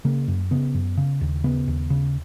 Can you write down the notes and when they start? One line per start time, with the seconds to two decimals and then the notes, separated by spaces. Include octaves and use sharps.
0.05 C#3 A#3
0.28 F#2
0.51 C#3 B3
0.74 F#2
0.97 C#3
1.21 D#2
1.44 C#3 B3
1.68 D#2
1.90 C#3